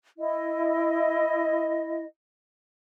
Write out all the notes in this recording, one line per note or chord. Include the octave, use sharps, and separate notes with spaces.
E4 D#5